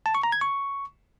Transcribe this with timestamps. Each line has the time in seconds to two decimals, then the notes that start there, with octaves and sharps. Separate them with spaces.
0.06 A5
0.15 C#6
0.23 A#5
0.32 G#6
0.41 C#6